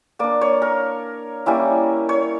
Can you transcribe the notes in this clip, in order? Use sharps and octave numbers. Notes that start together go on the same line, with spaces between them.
A#3 D4 D5
C#5
A#4
G3 A#3 C#4 E4
C#5